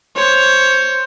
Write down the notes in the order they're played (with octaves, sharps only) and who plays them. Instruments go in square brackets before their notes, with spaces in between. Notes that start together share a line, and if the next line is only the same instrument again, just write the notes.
[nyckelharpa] C5 C#5